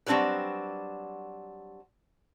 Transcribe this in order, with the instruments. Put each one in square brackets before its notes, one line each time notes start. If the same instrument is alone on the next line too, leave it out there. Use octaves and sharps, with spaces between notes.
[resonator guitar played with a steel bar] F#3 G3 C4 D4 G4 B4